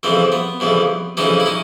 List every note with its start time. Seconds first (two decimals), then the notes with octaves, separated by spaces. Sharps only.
0.03 F2 C#3 E3 G3 C4
0.32 B3
0.60 F2 C#3 E3 G3
1.17 F2 C#3 E3 G3 C#4 D#4
1.40 E4
1.46 C#4 D#4